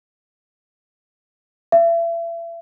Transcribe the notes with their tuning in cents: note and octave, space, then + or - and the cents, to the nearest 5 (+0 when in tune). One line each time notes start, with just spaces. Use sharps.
E5 +35